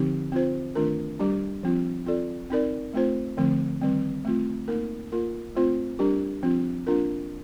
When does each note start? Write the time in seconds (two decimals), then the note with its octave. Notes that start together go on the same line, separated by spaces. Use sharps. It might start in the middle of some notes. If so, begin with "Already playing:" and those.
Already playing: D3 F3 C4 D#4 G4
0.32 C4 F4 C5
0.75 D#3 A3 D4 F4 A#4
1.19 G3 D4 G4
1.63 F3 C4 F4
2.06 C4 F4 A4 D5
2.50 C4 D#4 A#4 D5
2.94 A3 C4 F4 C5
3.37 D3 F3 A3 C4
3.81 D#3 G3 C4
4.25 A3 C4 F4
4.68 A#3 D#4 A#4
5.12 A#3 F4 A#4
5.55 A3 C4 F4 C5
5.99 G3 D4 G4 A#4
6.43 F3 C4 F4
6.87 A#3 D4 F4 A#4